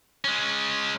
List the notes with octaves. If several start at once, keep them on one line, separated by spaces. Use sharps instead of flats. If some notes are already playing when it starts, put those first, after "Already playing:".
G#3 C#4